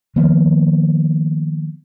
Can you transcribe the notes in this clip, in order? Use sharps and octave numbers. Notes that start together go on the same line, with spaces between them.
D#3 F3 A#3 B3